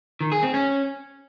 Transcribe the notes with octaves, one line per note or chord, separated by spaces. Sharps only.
D#3
G#4
C4
C#4